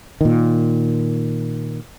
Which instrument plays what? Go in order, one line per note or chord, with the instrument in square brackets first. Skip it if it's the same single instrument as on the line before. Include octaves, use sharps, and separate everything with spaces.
[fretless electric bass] A#2 D#3